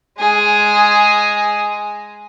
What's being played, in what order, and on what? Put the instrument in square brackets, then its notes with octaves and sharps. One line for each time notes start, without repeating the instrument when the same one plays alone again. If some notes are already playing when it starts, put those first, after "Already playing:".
[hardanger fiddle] G#3 G#4